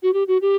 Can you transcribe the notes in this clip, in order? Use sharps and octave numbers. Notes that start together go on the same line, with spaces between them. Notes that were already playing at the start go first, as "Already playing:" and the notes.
F#4
G4
F#4
G4